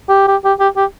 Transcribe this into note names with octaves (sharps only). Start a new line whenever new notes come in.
G4
G4
G4
G4
G4